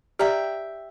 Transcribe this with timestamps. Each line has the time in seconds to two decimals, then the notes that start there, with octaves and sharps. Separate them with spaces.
0.19 G4 D5 E5 G5 A#5